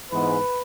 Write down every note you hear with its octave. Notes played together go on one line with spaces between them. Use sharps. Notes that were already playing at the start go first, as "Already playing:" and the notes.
G#2 E3 G#3 B3 B4